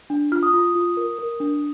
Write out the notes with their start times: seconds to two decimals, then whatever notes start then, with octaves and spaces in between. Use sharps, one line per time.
0.10 D4
0.32 F4 F6
0.43 D#6
0.54 F4
0.75 F4
0.97 A#4
1.18 A#4
1.40 D4